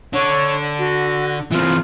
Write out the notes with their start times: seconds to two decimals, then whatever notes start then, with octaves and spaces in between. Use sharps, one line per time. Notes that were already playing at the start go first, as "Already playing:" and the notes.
0.13 D3 C#5
0.79 F#4
1.52 E3 C4 F4